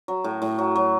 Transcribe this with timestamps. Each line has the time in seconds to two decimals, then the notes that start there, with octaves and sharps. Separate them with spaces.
0.08 F#3
0.24 A2
0.42 A2
0.59 F#3
0.76 F#3